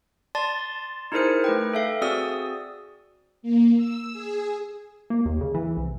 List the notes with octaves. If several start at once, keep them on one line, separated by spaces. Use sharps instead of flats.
D5 A5 C6 A6
D#4 E4 G#4 A#4 C5 C#7
A3 B4 G5
A4 E5 F5
C4 F#4 G#4 D5 D#6 E6
A#3
E6
G#4
A#3
D#2
C#3
E3
C2